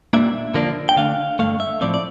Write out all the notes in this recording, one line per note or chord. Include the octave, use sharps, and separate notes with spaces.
A#2 G3 A#3 D4 E5
D3 F3 A#3 D4
G5
D3 A3 D4 F5
G2 D3 A3 F5
E5
A2 F3 C4 D5
D5